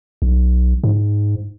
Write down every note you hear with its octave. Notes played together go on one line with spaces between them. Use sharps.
B1
G#2